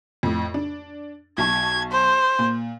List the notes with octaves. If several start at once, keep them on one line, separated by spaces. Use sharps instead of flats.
F2 A2
D4
B1 A5 C#6 G#6
C5
A#2